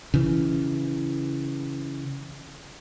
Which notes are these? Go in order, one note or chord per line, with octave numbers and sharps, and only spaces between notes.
C#3 E3